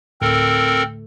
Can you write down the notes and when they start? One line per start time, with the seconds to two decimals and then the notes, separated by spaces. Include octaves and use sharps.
0.21 D2 A2 A3 C4 A4 A#4